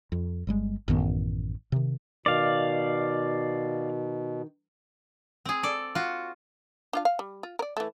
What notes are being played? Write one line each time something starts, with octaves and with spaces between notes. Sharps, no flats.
F2
G1 G3 G#3
A1 F#2 D#3 B3
C3 D#3
B2 D#3 D5 F5
C4 G#4
A4 D5
F4 F#4
D4 F4 F5
F5
G3
F4
A#4 D5
E3 A3